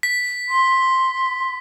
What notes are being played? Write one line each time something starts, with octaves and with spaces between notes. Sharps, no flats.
B6
C6